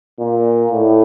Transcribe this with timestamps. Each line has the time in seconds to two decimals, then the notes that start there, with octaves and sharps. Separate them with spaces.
0.19 A#2
0.72 A2